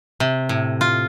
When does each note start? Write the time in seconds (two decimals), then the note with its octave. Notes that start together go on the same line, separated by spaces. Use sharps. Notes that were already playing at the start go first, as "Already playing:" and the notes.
0.20 C3
0.49 A2
0.81 F4